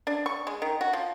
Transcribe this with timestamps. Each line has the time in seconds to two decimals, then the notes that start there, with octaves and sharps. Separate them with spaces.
0.07 D4
0.26 C#6
0.47 G#3
0.62 D#3
0.81 F#4
0.93 F3